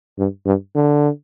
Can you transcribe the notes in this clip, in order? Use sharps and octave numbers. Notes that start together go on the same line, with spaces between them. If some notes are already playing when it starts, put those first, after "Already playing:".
G2
G2
D3